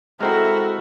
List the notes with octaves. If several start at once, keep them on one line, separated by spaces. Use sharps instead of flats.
G#3 C4 E4 F#4 A4 A#4 E5